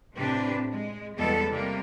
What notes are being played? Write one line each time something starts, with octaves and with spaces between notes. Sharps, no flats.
A2 C3 C4 D4 G4 B4
G#3
E2 B2 G3 G#3 B3 A4
C3 G3 A#3